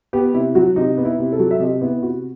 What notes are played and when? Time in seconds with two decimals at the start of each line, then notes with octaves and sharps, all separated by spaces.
0.13 B3 G4
0.34 C3 E4
0.55 F#3 F#4
0.76 C3 D#4
0.98 B3
1.05 E4
1.18 C3
1.33 A4
1.39 F#3
1.51 E5
1.60 C3 D#5
1.81 B3 E4
2.02 C3 F#4